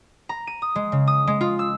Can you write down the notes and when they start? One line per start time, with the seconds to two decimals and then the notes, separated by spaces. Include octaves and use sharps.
0.29 A#5
0.47 D#7
0.62 D#6
0.75 G#3
0.92 C#3
1.07 D#6
1.27 G#3
1.41 F4
1.59 E6